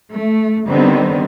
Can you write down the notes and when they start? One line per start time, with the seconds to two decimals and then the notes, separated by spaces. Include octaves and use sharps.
0.13 A3
0.67 D3 D#3 G3 B3 C4